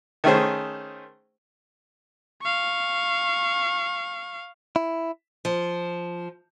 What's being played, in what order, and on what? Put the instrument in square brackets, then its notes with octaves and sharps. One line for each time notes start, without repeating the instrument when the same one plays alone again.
[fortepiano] D#3 A3 C#4 G#4 C5
[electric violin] F5 C#6
[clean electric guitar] E4
[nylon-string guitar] F3